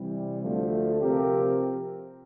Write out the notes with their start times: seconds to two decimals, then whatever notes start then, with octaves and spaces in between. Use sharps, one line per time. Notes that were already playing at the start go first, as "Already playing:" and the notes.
Already playing: C3 E3 G3
0.43 D2 D3 F3 A3
1.00 C3 F3 C4 G4 A#4